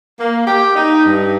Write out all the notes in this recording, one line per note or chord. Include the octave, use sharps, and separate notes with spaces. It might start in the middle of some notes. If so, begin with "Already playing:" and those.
A#3
G4
D#4
G2